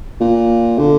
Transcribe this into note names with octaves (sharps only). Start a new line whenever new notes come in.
A#2
D3